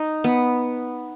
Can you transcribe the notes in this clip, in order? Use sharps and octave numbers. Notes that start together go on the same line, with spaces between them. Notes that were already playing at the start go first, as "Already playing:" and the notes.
Already playing: D#4
B3